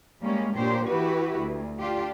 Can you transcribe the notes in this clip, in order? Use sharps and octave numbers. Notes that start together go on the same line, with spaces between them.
G3 G#3 A#3 C#4
A#2 A#3 D4 G4 C5 C#5
E3 E4 F#4 G4 B4
D2
D4 F4 G4